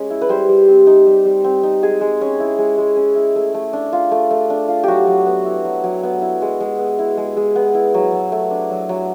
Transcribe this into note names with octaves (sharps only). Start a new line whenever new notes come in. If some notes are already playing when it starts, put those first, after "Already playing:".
Already playing: G#3 C#4
E4
B4
G3 C5
G3
C4
D#4
G3
G3
C4
D#4
G#3 G#4
G#3
C#4
E4
G#3
G#3
C#4
E4
A3
A3
D4
F4
A3
A3
D4
F4
F#3 F#4 G4
F#3
B3
E4
F#3
F#3
B3
E4
G#3
G#3
B3
E4
G#3
G#3
B3
E4
F#3
F#3
A3
D4
F#3
F#3